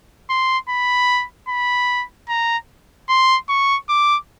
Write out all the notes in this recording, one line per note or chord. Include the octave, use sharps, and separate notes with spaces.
C6
B5
B5
A#5
C6
C#6
D6